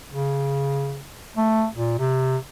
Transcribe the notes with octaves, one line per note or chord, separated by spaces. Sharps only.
C#3
A3
A#2
C3